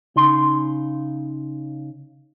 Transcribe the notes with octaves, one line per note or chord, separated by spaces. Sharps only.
C#3 D#4 C6